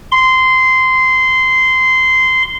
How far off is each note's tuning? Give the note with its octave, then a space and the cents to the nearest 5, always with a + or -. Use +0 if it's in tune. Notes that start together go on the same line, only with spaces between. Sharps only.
C6 -15